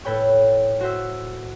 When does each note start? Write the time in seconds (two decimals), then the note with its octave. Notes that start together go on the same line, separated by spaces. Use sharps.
0.05 A2 A4 B4 C#5 G5 C#6
0.80 F#4 C5 E5